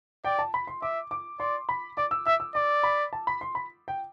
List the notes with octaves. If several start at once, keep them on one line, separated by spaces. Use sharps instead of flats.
D5 G5
A5
B5
C6
E5 D6
D6
D5 C6
B5
D5 D6
E6
E5 E6
E6
D5 D6
B5
A5
B5
C6
B5
G5